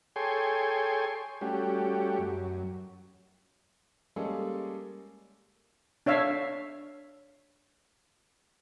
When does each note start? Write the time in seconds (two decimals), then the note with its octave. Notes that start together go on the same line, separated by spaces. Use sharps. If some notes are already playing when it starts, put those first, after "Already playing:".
0.16 G#4 A4 C#5 G5 G#5 C6
1.41 G3 A3 C#4 F#4 G4
2.19 F#2
4.16 G3 G#3 A#3 C#4 G#4 A4
6.06 D4 C#5 E5 F5